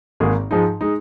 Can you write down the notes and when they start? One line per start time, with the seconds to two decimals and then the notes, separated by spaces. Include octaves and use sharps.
0.20 G#1 G#2 D#3 A#3 G#4
0.51 G#2 F3 G#3 D#4
0.81 G#3 D#4